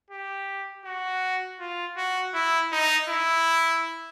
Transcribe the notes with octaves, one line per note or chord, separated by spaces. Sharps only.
G4
F#4
F4
F#4
E4
D#4
E4